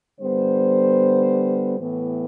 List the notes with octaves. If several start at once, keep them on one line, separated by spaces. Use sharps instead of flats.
D3 G3 B3 C5
A2 E3 B3